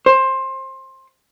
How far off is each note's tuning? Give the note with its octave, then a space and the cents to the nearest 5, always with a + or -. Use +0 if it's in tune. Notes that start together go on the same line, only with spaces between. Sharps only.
C5 +20